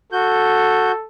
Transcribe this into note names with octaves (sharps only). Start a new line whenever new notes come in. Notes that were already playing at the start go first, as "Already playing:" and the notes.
F#4 A4 G6